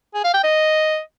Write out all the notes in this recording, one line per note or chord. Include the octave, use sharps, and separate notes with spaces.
G#4
F5
G5
D#5